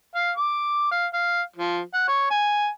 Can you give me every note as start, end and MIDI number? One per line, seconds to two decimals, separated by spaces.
0.15 0.32 77
0.37 0.88 86
0.92 1.06 77
1.14 1.41 77
1.56 1.81 53
1.94 2.07 78
2.08 2.27 73
2.31 2.68 80